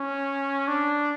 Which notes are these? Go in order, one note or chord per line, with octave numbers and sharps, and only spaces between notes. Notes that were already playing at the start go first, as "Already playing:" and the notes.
Already playing: C#4
D4